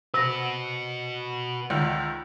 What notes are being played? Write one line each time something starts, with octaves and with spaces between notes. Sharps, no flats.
C3 F#4 B4 A#6
C#2 D3 D#3